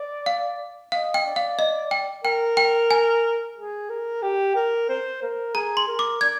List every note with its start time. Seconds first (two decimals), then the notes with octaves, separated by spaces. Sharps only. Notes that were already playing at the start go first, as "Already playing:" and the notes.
Already playing: D5
0.26 F5
0.92 D#5 F5
1.14 G5
1.25 D5
1.36 F5
1.59 D#5
1.91 G5
2.24 A#4 G5
2.57 G5
2.91 G#5
3.57 G#4
3.90 A#4
4.22 G4
4.56 A#4
4.89 C5
5.22 A#4
5.54 G#4 A#5
5.77 C6
5.88 A#4
5.99 D6
6.21 D5 G#6